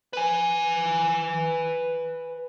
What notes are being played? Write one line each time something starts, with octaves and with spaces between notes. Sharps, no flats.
B4 G#5